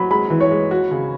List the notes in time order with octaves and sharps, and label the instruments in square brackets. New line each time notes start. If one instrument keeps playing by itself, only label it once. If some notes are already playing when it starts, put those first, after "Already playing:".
Already playing: [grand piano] F#3 [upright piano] B5
[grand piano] G#3 [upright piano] B5
[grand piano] E3
[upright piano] C#5
[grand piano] G#3
F#4
C#3